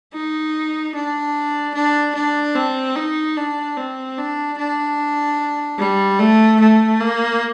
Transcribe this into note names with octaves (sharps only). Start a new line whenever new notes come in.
D#4
D4
D4
D4
C4
D#4
D4
C4
D4
D4
G3
A3
A3
A#3